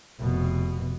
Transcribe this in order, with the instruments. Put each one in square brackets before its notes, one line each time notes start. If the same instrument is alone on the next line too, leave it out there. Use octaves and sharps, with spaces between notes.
[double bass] F1 B2